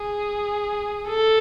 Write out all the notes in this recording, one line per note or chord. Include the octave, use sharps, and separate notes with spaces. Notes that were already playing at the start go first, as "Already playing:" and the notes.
Already playing: G#4
A4